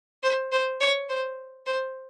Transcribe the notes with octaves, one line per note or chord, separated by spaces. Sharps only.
C5
C5
C#5
C5
C5